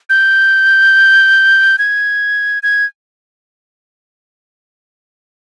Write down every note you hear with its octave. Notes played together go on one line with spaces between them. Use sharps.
G6
G#6
G#6